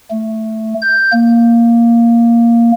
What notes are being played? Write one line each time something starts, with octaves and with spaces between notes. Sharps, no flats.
A3
G6
A#3